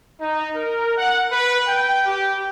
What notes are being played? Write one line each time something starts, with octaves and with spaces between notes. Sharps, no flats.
D#4
A#4
F#5
B4
G5
G4